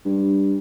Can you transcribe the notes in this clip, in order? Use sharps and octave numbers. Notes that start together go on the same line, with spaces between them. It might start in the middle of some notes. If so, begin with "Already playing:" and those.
G2